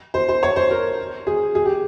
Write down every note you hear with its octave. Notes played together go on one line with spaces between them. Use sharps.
C5
C5
C#5
C5
A#4
G#4
G#4
G4